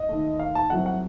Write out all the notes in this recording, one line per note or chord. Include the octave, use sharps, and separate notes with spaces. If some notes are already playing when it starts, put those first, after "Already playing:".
Already playing: D#5
D#2 D#3 A3
F5
A5
C2 C3 F#3 A3 F#5
F#5